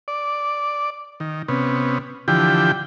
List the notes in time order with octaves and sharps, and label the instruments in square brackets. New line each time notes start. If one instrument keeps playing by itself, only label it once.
[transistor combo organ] D5
D#3
C3 B3 C#4
D3 E3 F3 G4 G5